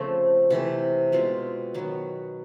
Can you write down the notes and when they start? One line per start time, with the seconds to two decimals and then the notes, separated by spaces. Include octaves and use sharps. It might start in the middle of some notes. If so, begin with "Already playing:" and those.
Already playing: C#3 F3 A3 C4
0.50 C3 E3 A3
1.12 B2 G#3 C4 F4
1.74 D#3 F#3 B3